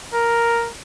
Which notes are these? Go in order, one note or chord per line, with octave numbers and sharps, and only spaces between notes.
A#4